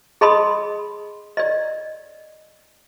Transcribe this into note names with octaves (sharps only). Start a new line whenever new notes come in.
G#4 D#5 A5 B5 C6 D#6
D5 D#5